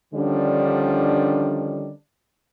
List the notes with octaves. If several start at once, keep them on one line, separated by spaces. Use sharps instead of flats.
D3 D#3 F3 G3 C#4 D4